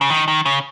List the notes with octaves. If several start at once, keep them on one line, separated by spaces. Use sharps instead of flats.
C#3
D#3
D#3
C#3